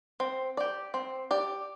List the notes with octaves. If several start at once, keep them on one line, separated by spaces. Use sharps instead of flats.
C4
G4 D5
C4
G4 D5